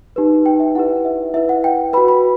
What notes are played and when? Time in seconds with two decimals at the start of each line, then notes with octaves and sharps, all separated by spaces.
0.16 D#4 G4 B4
0.46 G5
0.60 E5
0.75 E4 G4 B4 F#5
1.05 E5
1.34 E4 B4 E5
1.49 F#5
1.64 G5
1.93 F#4 B4 B5
2.08 B5